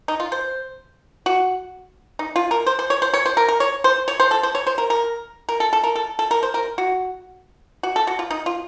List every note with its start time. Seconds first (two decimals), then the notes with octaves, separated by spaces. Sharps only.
0.08 D#4
0.20 F4
0.32 C5
1.26 F#4
2.19 D#4
2.36 F4
2.51 A#4
2.67 C5
2.79 C5
2.90 C#5
3.02 C5
3.14 C#5
3.26 C5
3.37 A#4
3.49 A#4
3.60 C#5
3.84 C5
4.08 C#5
4.20 C5
4.31 A4
4.43 C5
4.55 C#5
4.67 C5
4.78 A#4
4.90 A#4
5.49 A#4
5.60 A4
5.73 A4
5.84 A#4
5.95 A4
6.19 A4
6.31 A#4
6.43 C5
6.54 A#4
6.78 F#4
7.83 F#4
7.96 A4
8.07 F#4
8.19 F4
8.31 D#4
8.46 F4